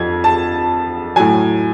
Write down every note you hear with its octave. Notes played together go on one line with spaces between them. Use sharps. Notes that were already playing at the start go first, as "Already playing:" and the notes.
Already playing: F2 F3 G#6
A5
A2 F#3 G#5